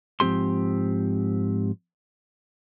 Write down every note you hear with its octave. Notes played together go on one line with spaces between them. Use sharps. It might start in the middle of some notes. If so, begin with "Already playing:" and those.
G#2 F3 C4 G4 C6